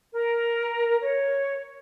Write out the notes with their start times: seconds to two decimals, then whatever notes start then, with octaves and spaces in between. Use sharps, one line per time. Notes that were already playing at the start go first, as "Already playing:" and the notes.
0.13 A#4
1.02 C#5